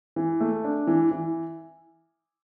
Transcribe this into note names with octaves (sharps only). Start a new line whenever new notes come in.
E3
A3
D4
E3
E3